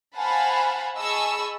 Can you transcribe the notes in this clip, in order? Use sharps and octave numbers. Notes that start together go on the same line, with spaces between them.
C5 F5 F#5 G#5 A5 B5
G#4 D#5 A5 B5 C#6 E6